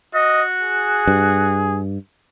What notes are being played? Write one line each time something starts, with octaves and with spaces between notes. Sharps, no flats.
F#4 D#5
G#4
G2